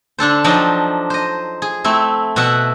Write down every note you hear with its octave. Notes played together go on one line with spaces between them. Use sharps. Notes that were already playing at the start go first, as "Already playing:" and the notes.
D3 D4 A4 C5
F3 F#3 D4 D#4 D#5 G5
C5 D#5
G#4
A3 C4 E4
B2 F#4 E5 F#5